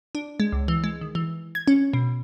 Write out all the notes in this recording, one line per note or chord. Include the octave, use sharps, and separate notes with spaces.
D4
G#3
C#2
E3
G#3
D#3
E3
G#6
C#4
B2